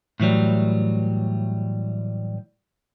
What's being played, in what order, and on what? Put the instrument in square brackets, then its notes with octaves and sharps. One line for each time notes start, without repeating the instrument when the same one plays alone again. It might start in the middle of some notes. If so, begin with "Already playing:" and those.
[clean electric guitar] A2 E3 F#3 G3